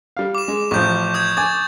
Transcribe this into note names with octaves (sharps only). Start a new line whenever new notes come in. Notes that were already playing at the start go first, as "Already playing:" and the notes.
G3 F5
D6 E7
G#3
A1 F3 C#6 G6
D#6 G6 G#6
G#5 D6 A6